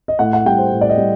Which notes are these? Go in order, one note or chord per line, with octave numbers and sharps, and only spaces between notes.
D#5
A2 F#5
F#5
G3 G5
C5
A2
D5
D#5
G3